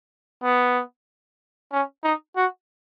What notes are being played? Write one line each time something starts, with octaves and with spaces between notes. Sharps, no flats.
B3
C#4
D#4
F#4